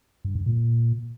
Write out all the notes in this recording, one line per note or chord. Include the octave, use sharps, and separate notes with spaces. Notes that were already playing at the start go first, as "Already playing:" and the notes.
G2
G2
A#2